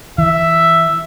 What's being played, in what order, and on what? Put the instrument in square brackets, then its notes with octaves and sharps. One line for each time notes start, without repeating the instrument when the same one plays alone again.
[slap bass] E3 [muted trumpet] E5